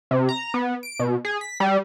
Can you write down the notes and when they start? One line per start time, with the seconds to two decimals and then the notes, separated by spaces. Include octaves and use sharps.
0.11 C3
0.29 A#5
0.54 B3
0.83 D7
1.00 B2
1.25 G#4
1.41 B6
1.60 G3